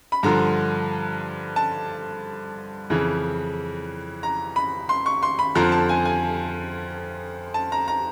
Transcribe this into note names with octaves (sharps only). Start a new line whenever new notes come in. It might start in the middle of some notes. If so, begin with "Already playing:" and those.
B5
G2 D3 F3 A#5
A5
F2 C#3 E3
A#5
B5
C6
C#6
C6
B5
F2 D3 F3 A#5
A5
G#5
G#5
A5
A#5
A#5